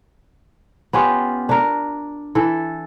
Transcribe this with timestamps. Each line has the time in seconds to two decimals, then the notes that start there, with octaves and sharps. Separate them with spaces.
0.93 B3 C#4 F4 G4
1.49 D4 A#4
2.35 E3 A4